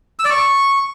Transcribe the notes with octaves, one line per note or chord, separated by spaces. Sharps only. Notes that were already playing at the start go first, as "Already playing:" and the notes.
E6
D5
C#6